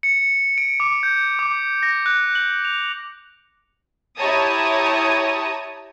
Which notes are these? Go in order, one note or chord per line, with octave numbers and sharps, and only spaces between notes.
C#7
D7
D6
G6
D6
A#6
F#6
F#7
F7
E4 G4 C#5 A5 A#5 D#6